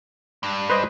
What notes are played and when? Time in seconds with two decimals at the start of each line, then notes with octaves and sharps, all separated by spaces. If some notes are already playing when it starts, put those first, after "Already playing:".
0.43 G2
0.70 B4 C5 D#5